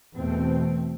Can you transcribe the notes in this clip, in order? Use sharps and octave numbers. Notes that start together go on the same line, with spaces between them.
E2 B2 A3 C4